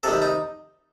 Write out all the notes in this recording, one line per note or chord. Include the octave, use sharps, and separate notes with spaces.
C3 D#3 G3 A4
D#4